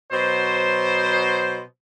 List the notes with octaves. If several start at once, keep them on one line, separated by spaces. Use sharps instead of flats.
B2 F#3 C5